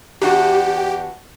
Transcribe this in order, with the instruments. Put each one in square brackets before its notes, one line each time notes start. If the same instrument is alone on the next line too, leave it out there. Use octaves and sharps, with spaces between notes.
[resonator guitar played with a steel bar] E2 D4 F#4 [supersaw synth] G4